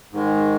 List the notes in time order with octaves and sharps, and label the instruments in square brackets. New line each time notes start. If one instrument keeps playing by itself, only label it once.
[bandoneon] G#2 D#3 G#3